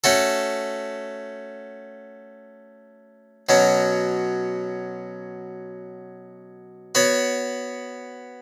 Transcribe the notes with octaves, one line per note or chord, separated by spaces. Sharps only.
A3 C#4 F#4 A4
B2 F#3 C#4
B3 F#4 C#5